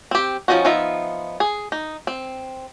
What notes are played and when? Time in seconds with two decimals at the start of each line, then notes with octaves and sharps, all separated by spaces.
0.11 C4 G4
0.48 F3 G#3 C#4 D#4 F#4
0.65 F3 B3 D#4 F4 E5
1.40 G#4
1.72 D#4
2.07 C4